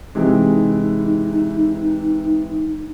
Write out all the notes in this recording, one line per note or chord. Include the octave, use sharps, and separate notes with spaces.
C3 E3 G#3 D#4